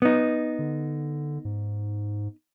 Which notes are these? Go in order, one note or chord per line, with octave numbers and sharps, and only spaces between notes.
B3 D#4
D3
G#2